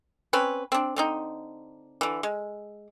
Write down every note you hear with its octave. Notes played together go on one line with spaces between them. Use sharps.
C4 C#4 B4
C4 D4
D3 C4 D#4
D3 E3
G#3